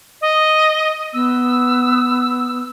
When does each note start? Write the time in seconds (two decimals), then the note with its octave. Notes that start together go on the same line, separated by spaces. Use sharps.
0.21 D#5
1.14 B3 E6